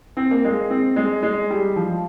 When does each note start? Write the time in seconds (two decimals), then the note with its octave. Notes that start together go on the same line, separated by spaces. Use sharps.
0.17 C4
0.31 A#3
0.45 G#3
0.70 C4
0.96 G#3
1.23 G#3
1.50 G3
1.76 F3